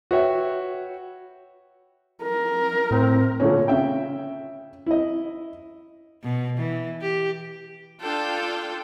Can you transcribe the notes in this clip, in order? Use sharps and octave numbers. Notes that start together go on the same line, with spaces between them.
F#4 B4 C#5 E5 G5
A#4
A2 C4
A#2 D3 A3 C#4
C#3 E5 G5
E4 D#5
B2
E3
G4
D4 F4 A4 G5